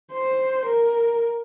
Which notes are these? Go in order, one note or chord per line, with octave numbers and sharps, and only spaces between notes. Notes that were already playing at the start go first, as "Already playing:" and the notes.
C5
A#4